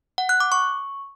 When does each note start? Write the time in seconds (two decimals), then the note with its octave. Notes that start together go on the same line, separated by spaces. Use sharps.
0.18 F#5
0.29 F#6
0.40 D6
0.52 C#6